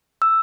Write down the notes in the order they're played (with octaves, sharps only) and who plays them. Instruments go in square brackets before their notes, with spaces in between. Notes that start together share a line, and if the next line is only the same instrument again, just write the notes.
[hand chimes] E6